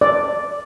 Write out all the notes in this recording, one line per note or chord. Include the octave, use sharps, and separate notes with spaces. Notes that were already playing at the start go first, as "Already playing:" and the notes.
D5